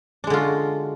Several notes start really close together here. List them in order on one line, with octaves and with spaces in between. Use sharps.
D4 G#3 D3 F4 F#4